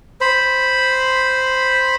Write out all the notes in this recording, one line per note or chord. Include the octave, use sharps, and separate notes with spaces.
C5 B5